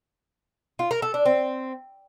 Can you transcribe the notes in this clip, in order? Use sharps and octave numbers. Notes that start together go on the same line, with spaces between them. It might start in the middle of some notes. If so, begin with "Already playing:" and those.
F4
A#4
A4
D4
C4